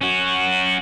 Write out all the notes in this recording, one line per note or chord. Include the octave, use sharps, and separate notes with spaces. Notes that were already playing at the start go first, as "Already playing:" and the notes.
C#4 F#4